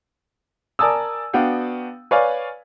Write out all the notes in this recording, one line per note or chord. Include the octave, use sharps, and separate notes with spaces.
A#4 D5 G#5 A5 D#6 E6
B3 D4 F#4 F5 G5
B4 C#5 D5 F5 G#5